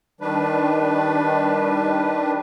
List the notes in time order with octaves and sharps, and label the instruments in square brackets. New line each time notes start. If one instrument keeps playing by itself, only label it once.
[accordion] D#3 G3 D4 B4